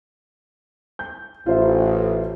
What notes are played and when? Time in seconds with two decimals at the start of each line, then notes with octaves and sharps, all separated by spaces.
0.99 G6
1.46 A1 F4 C5 E5